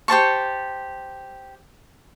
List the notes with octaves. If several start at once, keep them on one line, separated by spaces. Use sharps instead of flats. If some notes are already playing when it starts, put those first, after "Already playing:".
G4 C5 A5 C#6